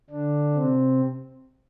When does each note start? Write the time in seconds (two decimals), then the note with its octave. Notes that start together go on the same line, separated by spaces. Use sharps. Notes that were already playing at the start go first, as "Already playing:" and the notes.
0.10 D3 D4
0.54 C3 C4